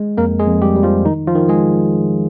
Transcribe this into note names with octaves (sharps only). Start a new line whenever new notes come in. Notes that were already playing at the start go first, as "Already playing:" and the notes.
Already playing: G#3
F2 A#3 A#4
G#3 G#4
F2
G3 G4
G3
F3 F4
D#3 D#4
F3 F4
D#3
G#3 G#4